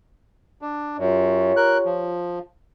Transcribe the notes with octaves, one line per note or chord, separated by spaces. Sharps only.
D4
F#2 F4 G4 C#5
A#4 F#6
F3